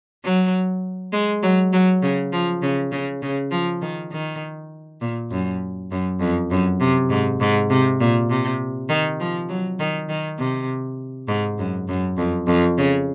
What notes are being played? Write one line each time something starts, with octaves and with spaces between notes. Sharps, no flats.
F#3
G#3
F#3
F#3
C#3
F3
C#3
C#3
C#3
F3
D#3
D#3
A#2
F#2
F#2
F2
F#2
C3
G#2
G#2
C3
A#2
C3
D#3
F3
F#3
D#3
D#3
C3
G#2
F#2
F#2
F2
F2
C#3